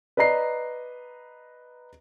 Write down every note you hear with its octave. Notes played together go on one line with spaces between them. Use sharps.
B4 D5 D#5 A#5 C7